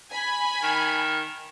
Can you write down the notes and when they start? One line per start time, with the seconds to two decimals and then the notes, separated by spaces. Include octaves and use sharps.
0.10 G#5 B5
0.63 D#3